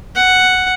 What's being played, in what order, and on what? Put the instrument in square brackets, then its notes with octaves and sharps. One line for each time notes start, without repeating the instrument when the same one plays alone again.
[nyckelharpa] F#5